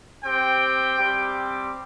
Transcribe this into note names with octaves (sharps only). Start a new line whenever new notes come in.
C4 G4 G5
G3 C4 G4